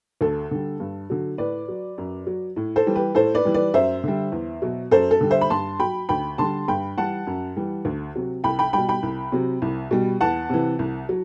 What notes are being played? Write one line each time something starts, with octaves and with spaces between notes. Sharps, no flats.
D2 A4
D3 G3
G2
D3 F#3
A2 B4 D5
F#3
F#2
F#3
A2
A4 C5
E3 G3
G4 B4
A2 A4 C5
B4 D5
E3 G3
B4 D5
F#2 C5 E5
D3 G3
E2
B2 F#3
F#2 A4 C5
A4
D3 G3
C5 E5
B5
G2 A5 C6
F#3 G5 B5
D2 G5 B5
D3 G3 A5 C6
G2 G5 B5
E3 G3 F#5 A5
F#2
E3 G3
D2
C3 F#3
C2 G5 B5
G5 B5
B2 G3 G5 B5
G5 B5
C2
C3 F#3
C2
B2 G3
E2 F#5 A5
C3 E3
C2
F#3